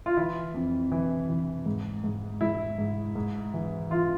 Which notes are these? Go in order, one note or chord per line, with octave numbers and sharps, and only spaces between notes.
F4
E3 E4
F2
E3
E3
G#2
G#2
G#2 E4
G#2
G#2
E3
E3 F4